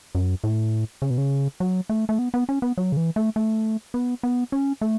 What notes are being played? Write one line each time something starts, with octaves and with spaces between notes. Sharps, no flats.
F#2
A2
C#3
B2
C#3
F#3
A3
A3
B3
B3
C#4
B3
F#3
C#3
E3
A3
A3
B3
B3
C#4
A3